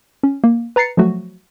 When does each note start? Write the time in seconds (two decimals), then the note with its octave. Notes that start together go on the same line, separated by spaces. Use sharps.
0.23 C#4
0.44 A#3
0.76 B4 A#5 A6 C7 C#7
0.97 F3 F#3 A3 F#4